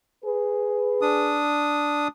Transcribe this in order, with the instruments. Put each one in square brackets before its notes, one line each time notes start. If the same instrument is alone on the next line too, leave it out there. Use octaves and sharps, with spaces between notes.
[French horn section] G#4 B4
[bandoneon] D4 D#6